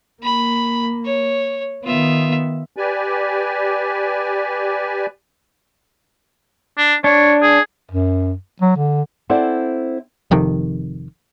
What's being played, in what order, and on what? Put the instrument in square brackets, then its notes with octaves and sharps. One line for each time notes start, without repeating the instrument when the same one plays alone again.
[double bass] A#3 [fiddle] B5
[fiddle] C#5
[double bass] D#3 B3 [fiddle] F4 E5
[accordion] G4 B4 D5 G#5
[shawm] D4
[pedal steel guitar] D4 [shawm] C#5
[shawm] G#4
[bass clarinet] F#2
F#3
D3
[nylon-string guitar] C4 E4 A4 C5 D5 F#5
[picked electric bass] F1 F2 C3 D#3